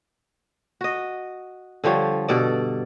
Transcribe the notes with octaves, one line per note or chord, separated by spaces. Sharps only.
F#4 D#5
D3 F3 G3 C#5
G2 B2 A4 D5